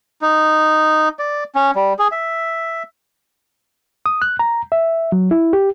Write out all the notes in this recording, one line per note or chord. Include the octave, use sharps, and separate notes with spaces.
D#4
D5
C#4
G3
G#4
E5
D#6
F#6
A#5
E5
F#3
E4
G4